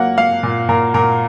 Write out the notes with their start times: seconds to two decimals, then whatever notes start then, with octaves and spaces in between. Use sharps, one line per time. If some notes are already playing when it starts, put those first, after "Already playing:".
Already playing: F#3 A#3 F#5
0.18 A#3 F5
0.43 A#2
0.69 A#2 A#4
0.94 A#2 A#4